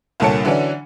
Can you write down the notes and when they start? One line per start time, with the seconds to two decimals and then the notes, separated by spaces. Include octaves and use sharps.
0.20 C2 A#2 D3 A4 C#5 C#7
0.45 D3 E3 F#3 C#4 D4